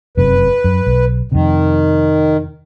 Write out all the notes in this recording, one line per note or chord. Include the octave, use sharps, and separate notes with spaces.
F1 F#2 C3 B4
F#2
B1
F2 C3 D#3